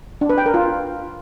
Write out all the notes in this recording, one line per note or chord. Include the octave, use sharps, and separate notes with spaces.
D4
B4
G5
A#4
F4